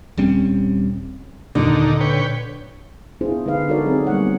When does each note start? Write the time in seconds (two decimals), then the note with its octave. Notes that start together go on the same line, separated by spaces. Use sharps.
0.18 D#1 G3 C4 C#4
1.55 D#2 A#2 D3 D4 D#4
2.00 B4 C#5 G5
3.21 B3 D4 E4 F4 G#4 C5
3.46 D3 G#3 D#4 B4 F5
3.69 D#4 F#4 A4 A#4 C#5 D5
3.85 F#3 C4 D#4 G#4
4.07 G3 A#3 B3 C#5 F#5